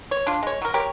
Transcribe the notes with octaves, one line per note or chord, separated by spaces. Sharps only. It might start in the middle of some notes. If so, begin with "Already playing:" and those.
C#5
D4 F4
G#3 C#5
F#3 A#4
G4 A#4 C#5